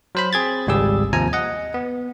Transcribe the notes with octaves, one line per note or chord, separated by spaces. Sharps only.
F#3 C5 B5
C4 G#4 G#6 A6
G#1 C#2 G3 G4 G#4 E6
D#2 C3 F3 G#5 A#5
D#5 F#5
B3